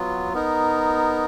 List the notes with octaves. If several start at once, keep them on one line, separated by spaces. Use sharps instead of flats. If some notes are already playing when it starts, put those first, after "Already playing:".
Already playing: F#3 B3 F4
B3 D#4 A#4